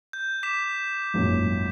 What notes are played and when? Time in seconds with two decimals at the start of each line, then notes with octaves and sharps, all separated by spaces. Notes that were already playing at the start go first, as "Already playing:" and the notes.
0.13 G6
0.43 D6 B6 E7
1.14 G#1 F#2 A#2